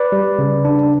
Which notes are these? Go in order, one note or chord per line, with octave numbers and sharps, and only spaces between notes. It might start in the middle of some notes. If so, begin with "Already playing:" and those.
Already playing: B4 D5
G3
C#3
D4